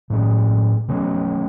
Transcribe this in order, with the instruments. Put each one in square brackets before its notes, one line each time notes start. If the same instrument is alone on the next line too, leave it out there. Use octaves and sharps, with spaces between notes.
[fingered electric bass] A2 G#3 C#4
B2 A3 C#4